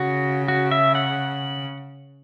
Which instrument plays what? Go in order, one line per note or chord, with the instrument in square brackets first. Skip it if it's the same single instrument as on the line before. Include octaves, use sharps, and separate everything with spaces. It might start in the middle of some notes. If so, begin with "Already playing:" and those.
Already playing: [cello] C#3 [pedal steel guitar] F#4
[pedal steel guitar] F#4
E5
F#5